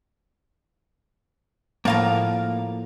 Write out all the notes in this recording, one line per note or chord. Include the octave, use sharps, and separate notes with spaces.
A2 F3 A#3 A#4 F5